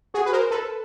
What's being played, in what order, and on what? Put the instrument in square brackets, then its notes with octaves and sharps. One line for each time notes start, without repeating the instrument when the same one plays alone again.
[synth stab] F#4 G#4
B4
A#4 C5
A4 B4